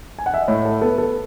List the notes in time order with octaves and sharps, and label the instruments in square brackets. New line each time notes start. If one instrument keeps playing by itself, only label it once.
[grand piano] G#5
F#5
E5
D#5
[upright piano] A2 [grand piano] C#5
[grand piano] A4
[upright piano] B3 [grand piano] A4
[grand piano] A4